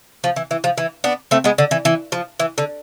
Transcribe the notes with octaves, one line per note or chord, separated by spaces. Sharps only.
F3
E3
E3
F3
E3
B3 D4
A3 C4
G#3 B3
D3
E3
E3
F3
E3
D3